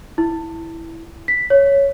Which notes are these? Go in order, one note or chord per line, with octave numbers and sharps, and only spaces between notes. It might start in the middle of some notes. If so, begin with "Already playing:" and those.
E4
B6
C#5